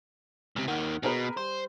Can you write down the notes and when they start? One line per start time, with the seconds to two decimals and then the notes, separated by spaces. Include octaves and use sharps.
0.56 C#2 C3
0.68 D#2 D#3 F#5 F6
1.03 B2 G#4 A#4 B4
1.37 G3 C5